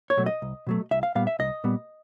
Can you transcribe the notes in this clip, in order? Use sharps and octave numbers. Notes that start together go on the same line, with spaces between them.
C#5
B2 F#3 A3
D#5
C2
B2 F#3 A3
C2 E5
F5
A#2 G3 B3 F5
E5
C2 D#5
A#2 G3 B3